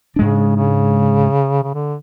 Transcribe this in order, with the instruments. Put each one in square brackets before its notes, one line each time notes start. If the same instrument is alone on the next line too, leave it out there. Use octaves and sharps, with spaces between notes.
[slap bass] G#2 G#3 D4 [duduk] C#3
[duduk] C#3
C#3
D3